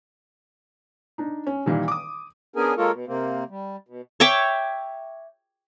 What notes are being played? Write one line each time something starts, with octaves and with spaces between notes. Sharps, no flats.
D4 D#4
C#4
A#2 D#3 E3 G3
D6 D#6
B3 C#4 D4 G#4 A#4 G#5
G#3 A#3 F4 A4 A#4 C#5
B2
C3 A#3 C4
G3
B2
C#5 E5 G5 D6